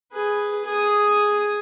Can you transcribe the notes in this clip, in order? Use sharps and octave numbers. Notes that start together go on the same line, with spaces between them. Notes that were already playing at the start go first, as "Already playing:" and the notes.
G#4 B4
G#4 D#6